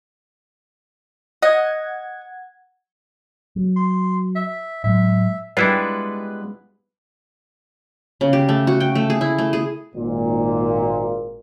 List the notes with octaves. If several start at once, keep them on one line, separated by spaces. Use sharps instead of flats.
D#5 F#5 G#6
F#3
C6
E5
A2 F#3 G#3 E5
G3 G#3 B3 D4 E4 F4 B4
C#3
G4
A3
F#4
G5
A3
G#4
E4
A3
G#4
G#1 A#2